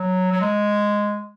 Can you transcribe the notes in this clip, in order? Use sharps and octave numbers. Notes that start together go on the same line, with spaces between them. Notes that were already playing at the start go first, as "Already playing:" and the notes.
Already playing: F#3
F#3
G#3